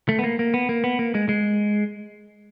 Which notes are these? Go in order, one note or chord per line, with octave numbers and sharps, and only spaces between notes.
A3
B3
A#3
A#3
B3
A#3
B3
A#3
G#3
G#3